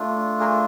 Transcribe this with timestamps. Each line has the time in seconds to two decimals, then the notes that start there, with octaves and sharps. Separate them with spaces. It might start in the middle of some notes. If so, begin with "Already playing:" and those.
Already playing: A3 D4 F4
0.40 G#4 A#4